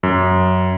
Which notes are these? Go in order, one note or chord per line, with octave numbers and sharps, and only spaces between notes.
F#2